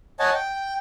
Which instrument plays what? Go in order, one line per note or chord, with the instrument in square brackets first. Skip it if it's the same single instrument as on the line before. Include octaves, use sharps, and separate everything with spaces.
[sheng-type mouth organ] C#5 D#5 F#5 G#5 A5
G5